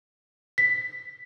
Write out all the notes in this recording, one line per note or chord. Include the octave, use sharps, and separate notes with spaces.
B6